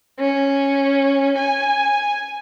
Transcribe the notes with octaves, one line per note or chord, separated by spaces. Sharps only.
C#4
G#5